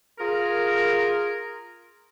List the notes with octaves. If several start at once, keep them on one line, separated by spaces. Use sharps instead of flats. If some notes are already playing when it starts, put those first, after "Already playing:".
F4 G#4 A#4